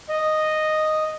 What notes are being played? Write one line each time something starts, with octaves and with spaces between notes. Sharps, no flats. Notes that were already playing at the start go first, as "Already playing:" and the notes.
D#5